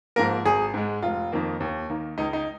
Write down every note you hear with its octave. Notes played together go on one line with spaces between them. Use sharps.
G#2 F3 A#3 A#4
G#1 G#4
G#2 G#3
F1 F4
F2 D#3 A#3
D#2
D#3 A#3
C#2 D#4
D#4